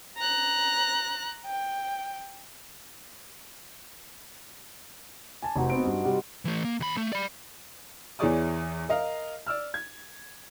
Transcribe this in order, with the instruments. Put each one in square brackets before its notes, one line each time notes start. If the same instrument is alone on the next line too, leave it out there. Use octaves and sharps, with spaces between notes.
[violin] A#5 F#6
G5
[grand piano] G#5 A5 [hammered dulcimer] D6
[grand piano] F1 [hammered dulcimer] D#4 F#4 C5
[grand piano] B3 C4 D7
G2
[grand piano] C3 G3 [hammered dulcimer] F#4 D#5
[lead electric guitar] E3 A3
A#3
D#2 B5
A3
D5 B5
[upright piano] E2 E3 G#4 C#5 D5 D#6
A#4 D#5 F5
D5 E6 F6
G#6